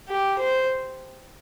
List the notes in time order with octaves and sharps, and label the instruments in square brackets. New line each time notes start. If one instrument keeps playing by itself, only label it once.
[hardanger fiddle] G4
C5